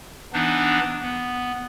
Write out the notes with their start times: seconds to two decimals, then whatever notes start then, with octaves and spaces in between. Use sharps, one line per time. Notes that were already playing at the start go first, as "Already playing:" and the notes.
0.33 E3 B3 D4 D#4
1.02 B3